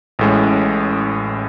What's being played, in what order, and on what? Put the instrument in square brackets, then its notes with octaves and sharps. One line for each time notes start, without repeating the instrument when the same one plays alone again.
[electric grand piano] A1 A2 G#3 C#4